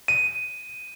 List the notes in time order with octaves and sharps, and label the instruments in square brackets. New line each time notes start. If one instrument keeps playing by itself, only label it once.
[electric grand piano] D#7